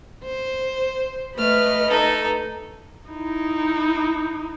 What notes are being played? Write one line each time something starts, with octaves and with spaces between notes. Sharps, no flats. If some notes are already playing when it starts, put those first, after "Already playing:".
C5
A3 B4 D#5 F6
D#4 A4
D#4 E4